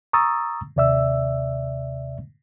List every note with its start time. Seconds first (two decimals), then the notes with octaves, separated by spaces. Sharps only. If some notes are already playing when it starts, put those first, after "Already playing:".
0.13 A#5 C#6 D#6 E6 A6
0.76 D#2 C3 D5 E5 E6